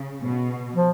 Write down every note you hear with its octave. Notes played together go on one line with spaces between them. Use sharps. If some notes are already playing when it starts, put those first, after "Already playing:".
Already playing: C#3
B2
F3